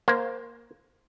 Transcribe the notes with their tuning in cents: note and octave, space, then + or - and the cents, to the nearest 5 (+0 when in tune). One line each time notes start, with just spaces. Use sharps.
A#3 +5 C5 -5